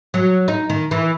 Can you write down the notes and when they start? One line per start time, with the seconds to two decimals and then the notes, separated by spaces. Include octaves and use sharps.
0.14 F#3
0.48 D#4
0.70 D#3
0.91 E3